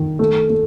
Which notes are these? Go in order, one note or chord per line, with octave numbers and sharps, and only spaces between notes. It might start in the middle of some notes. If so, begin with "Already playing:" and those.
Already playing: D#3
A3
A3